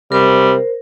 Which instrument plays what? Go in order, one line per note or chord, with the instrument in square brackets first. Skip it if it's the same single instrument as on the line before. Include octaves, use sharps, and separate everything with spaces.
[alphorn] C3 [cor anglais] G3 [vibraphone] A#4 C5